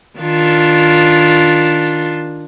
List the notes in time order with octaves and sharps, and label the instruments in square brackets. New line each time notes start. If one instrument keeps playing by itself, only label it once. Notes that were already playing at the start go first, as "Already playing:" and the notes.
[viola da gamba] D#3 D4 F4